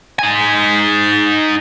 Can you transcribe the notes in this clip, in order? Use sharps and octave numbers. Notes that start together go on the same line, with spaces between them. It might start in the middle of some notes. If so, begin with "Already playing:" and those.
D#4 G#5